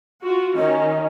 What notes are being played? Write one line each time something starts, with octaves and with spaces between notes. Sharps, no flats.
F4 F#4
D#3 C#4 D#5